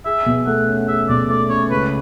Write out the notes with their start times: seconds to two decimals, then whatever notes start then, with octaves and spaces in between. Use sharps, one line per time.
0.05 G#4 E5
0.26 B2
0.47 A3 F#5
0.67 C#4
0.88 G#4 E5
1.09 B2 D5
1.29 A3 D5
1.50 C#4 C#5
1.70 C#2 B4